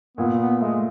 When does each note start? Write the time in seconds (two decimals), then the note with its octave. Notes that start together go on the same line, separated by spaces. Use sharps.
0.17 A#2 B3
0.40 B3
0.61 G#3 A3